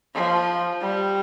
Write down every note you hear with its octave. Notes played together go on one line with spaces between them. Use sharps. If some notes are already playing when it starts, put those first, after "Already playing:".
F3
G3